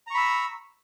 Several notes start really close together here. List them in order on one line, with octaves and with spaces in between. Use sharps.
A#5 C#6 B5 E6